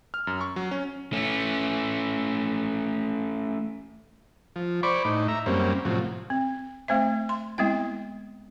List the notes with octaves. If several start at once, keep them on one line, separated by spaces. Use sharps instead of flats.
F6
F#2
C#6
F#3
C#4
A3 C#4
F3
C5 D5 B5 C#6 D6
A2 D#4
E5 A#5
F#2 G3 A#3 C4 C#4
A2 C3 F3 F#3
C4
A3 C4 C5 E5
C6
G#3 B3 C4 E4 G5